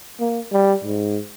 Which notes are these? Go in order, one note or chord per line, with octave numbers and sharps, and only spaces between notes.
A#3
G3
G#2